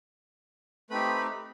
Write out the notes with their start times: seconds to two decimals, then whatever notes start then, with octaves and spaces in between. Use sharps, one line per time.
0.90 A3 C4 D#4 G4 B4 B5